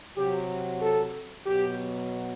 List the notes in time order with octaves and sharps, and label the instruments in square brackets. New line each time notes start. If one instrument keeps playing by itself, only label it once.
[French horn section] C3 F#3 G4
A4
B2 F#3 G4